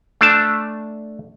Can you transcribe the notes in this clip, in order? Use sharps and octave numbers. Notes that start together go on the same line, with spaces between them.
A3 D4 A5